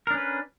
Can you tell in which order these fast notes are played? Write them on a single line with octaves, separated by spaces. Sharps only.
A#4 D4 C#4 B4